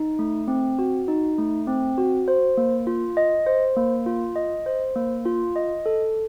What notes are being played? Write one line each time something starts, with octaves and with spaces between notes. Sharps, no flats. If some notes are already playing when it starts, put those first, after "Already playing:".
Already playing: D#4
A3
C4
F#4
D#4
A3
C4
F#4
C5
A#3
F4
D#5
C5
A#3
F4
D#5
C5
A#3
F4
D#5
A4